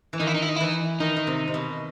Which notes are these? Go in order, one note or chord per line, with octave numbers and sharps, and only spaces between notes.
E3
D#3 D#4
E4
D#4
E4
D#4
E4
E3 D#4
D#3 D#4
D#3
C3
C3
B2